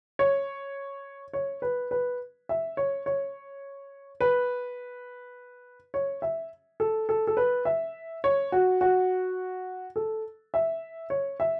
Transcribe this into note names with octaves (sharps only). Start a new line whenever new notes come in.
C#5
C#5
B4
B4
E5
C#5
C#5
B4
C#5
E5
A4
A4
A4
B4
E5
C#5
F#4
F#4
A4
E5
C#5
E5